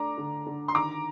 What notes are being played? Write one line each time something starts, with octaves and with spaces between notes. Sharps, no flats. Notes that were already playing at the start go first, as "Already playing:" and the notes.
Already playing: A3 D4 A#5 D6
D3
D3
C6
D#3 A#5 D6